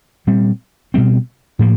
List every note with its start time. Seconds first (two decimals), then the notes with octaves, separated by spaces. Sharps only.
0.27 A#2 G3 C4
0.94 B2 G3 C4
1.59 A2 F3 A#3